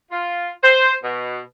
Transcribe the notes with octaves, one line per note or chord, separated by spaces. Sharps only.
F4
C5
B2